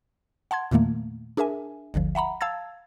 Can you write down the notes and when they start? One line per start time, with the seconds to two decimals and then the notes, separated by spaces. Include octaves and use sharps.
0.51 F#5 A5 C6 G#6
0.71 E2 A#2 D#3 A3 A#3
1.37 D4 G#4 A#4 E5 G#5
1.94 G1 D2 D3 F3
2.15 E5 F#5 A#5 B5
2.41 F5 A5 E6 G#6 A6